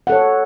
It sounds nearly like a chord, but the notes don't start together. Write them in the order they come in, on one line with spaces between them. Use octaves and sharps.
F#5 A4 C#5